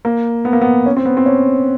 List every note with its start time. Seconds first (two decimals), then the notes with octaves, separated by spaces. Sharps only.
0.05 A#3
0.45 B3
0.53 A#3
0.62 B3
0.86 C#4
0.97 C4
1.06 B3
1.17 C4
1.26 C#4